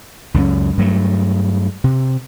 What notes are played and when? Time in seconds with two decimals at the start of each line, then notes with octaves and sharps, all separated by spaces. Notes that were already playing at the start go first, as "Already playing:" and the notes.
0.34 C#2 F#2 G3 C#4
0.77 G2 F#3 A3
1.84 C3